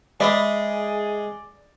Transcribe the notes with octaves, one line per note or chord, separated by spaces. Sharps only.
G#3 G#4 D5 E5 B5 D#6